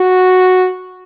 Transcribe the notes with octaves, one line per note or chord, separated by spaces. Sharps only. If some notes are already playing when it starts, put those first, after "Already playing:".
Already playing: F#4